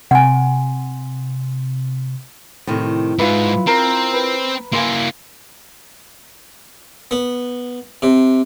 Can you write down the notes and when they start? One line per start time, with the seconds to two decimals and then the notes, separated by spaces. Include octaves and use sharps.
0.11 C3 F#5 G#5
2.67 A2 C3 D#3
3.19 G#2 E4 F4 B4
3.67 C4 A#4
4.13 B4
4.73 A#3 E4 F5 G#5 C6
7.11 B3
8.02 C3